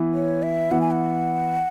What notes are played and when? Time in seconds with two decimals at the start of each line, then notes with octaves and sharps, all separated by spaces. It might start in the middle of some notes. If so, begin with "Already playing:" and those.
Already playing: E3 B3 E4
0.14 C#5
0.43 E5
0.71 E3 B3 E4 F#5
0.81 G#5
0.91 F#5